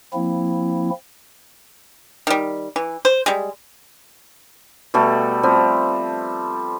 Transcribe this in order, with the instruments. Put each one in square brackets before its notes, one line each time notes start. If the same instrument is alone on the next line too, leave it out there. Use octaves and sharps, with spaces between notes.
[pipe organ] F3 A#3 C4 E4
[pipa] D#3 G3
E3
C5
G3 G#3
[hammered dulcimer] B2 G3 A3 A4
F3 G3 C4